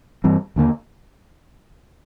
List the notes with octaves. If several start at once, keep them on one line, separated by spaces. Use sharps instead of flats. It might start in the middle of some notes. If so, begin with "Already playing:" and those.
G2 E3 G3 C4
D#2 D3 G3 A#3